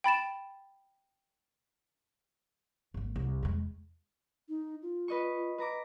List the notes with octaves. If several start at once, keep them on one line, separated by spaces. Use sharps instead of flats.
G5 B5 A6 E7
G#1 A#3
C2
E2 G#3
D#4
F4
B4 D#5 C#6
B4 A#5 D6